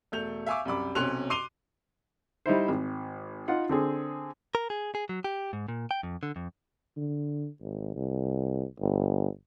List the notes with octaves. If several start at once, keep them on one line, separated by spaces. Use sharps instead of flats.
E1 A3 G6 F7
E5 F5 G#5 C#6 D6
C2 F#2 B5 D6
B1 C3 C#4 C6 F#6 F7
C6 D6 C7 D#7 F7 G7
G3 D#4 E4 C5
G#1
D#4 F4 F#5
D3 C4 G#4
A#4
G#4
G#4
F#3
G4
G#2
A#2
G5
F2
D3
F2
D3
G#1
C2
G1